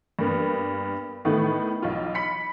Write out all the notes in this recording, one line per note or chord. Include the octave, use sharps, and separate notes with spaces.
G2 A#3 B3
A2 D#3 A3 B3
B1 F4
B5 B6 C#7